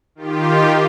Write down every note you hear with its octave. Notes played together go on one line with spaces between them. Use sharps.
D#3 F4 G4